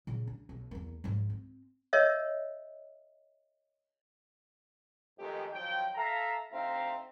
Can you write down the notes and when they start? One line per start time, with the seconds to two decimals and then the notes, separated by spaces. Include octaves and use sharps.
0.07 A#2 C#3
0.27 D4
0.49 B1
0.71 E2 A#3
1.04 G#2 F3
1.30 C4
1.93 A#4 C#5 D#5 E5
5.19 F2 D#3 G#3 A3 G4 D#5
5.52 D#3 F3 F#3 G5
5.95 A4 E5 F5 A5 A#5
6.52 D2 C4 D#4 E5 F5 A#5